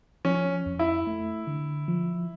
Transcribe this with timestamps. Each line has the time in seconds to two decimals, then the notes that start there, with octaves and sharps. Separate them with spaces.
0.25 F3 C#4
0.66 F2
0.79 E4
1.07 A3
1.47 D3
1.88 F3